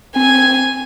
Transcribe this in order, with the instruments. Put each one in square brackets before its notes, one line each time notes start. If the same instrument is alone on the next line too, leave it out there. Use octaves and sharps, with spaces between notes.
[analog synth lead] C4 [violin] G#5